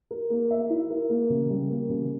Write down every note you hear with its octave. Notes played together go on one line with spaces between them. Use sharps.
A#4
A#3
E5
E4
A#4
A#3
C#3
G3
A#3
C#3